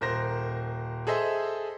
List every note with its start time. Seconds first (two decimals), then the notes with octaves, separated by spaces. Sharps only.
0.01 D#1 A#4 C5 A#6
1.07 G#4 A4 C5 D#5 E5